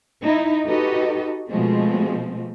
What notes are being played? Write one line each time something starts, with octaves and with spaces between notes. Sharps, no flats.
D#4 E4
D#4 F#4 G4 A4 B4 D#5
B2 F3 G#3 A3 C4